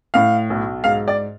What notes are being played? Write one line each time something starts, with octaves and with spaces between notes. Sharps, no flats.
A2 F5
B1
G#2 F5
D5